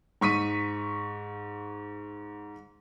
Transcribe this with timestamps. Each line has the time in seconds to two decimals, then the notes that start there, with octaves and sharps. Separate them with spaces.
0.21 G#2 C#6 B6 D#7